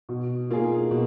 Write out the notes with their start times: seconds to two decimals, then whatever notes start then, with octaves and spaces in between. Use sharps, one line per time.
0.09 B2
0.50 A#3 F4 G#4
0.91 B2